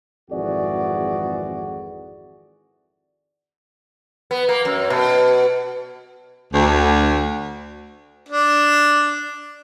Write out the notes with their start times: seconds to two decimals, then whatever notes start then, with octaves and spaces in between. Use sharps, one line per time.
0.30 G#1 F2 E3 F#4 G#4 D5
4.31 B3
4.49 A#3
4.65 F#2
4.90 B2
6.52 D2
8.29 D4